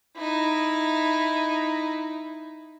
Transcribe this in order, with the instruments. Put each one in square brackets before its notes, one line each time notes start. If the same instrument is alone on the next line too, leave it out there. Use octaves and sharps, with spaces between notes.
[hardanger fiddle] D#4 E4